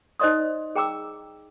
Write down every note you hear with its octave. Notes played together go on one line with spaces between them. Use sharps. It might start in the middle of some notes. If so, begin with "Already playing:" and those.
D#4 C5 D5 D#5 C6 D#6
G#4 G5 A#5 D6 E6